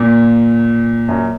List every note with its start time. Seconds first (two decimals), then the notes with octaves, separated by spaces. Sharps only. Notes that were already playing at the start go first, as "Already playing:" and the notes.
Already playing: A#2
1.09 F#2